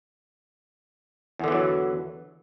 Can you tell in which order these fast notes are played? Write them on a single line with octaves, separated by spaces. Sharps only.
E2 D3 E3 F#3